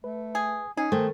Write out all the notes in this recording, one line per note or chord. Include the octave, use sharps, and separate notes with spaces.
A3 B4
G#4
C#4 D#4 G#4
D#3 A3 C5 G5